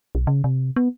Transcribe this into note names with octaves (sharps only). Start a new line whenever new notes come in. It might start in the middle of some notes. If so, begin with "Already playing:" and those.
B1
C#3
C3
B3